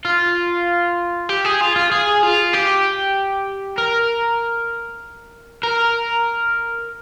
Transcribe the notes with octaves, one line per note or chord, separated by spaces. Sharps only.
F4
G4
G#4
F4
F4
G#4
F4
G4
A#4
A#4